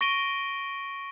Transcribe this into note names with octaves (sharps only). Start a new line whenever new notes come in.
C#6 A#6 D7 D#7 G7